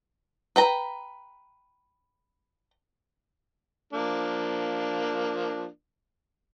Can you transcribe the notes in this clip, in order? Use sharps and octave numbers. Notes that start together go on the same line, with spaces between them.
B4 G5 A#5
F3 A#3 D4